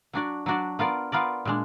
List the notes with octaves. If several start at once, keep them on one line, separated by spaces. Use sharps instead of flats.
F#3 D4 F#4 D5
F#3 D4 F#4 D5
B3 F4 A#4 D5
B3 F4 A#4 D5
A#2 G#3 D4